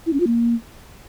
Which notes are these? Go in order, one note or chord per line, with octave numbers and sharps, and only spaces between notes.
E4
C#4
F4
A#3